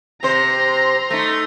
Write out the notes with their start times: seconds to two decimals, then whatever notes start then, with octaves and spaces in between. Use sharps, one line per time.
0.23 C3 C5 A#5 C6
1.10 A3 D#4